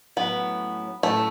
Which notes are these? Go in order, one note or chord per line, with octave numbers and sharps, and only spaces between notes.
A2 F#3 B3 C#4 E4
A2 F#3 A3 C#4 E4